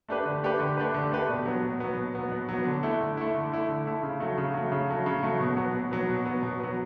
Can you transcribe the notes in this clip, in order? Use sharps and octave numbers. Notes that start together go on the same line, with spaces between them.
A3 D4 G4 B4
D3
A3 D4 G4 B4
D3
A3 D4 G4 B4
D3
A3 D4 G4 B4
B2
F#3 B3
B2
F#3 B3
B2
F#3 B3
B2
F#3 B3
D3
A3 E4
D3
A3 E4
D3
A3 E4
D3
A3 E4
C#3
F#3 A3
C#3
F#3 A3
C#3
F#3 A3
C#3
F#3 A3
B2
F#3 B3
B2
F#3 B3
B2
F#3 B3
B2
F#3 B3